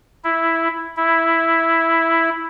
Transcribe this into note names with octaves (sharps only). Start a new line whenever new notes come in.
E4
E4